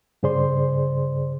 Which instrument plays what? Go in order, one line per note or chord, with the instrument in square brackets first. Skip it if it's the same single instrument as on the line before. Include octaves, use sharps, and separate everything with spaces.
[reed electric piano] G2 C#3 G#4 C5 D5 C6